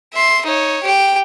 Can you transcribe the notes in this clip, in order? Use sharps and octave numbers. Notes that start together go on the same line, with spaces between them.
E5 C6
D#4 C#5
G4 G5